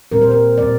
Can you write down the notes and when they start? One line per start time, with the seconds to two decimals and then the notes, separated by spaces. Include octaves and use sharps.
0.12 A#2 G3 C4 A#4
0.21 C5
0.31 A#4
0.58 A#2 G3 C4 D5